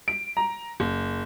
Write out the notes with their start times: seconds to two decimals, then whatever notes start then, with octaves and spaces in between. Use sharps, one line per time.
0.08 D7
0.37 A#5
0.80 F#1